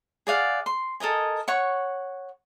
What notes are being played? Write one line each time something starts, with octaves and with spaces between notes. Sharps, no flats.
G#4 D5 F5 F#5
C6
A4 A#4 D#5 G#5
C#5 F#5 C#6